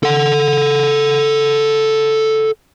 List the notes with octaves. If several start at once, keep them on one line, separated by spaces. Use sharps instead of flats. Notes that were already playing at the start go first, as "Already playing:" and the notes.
A4 F#5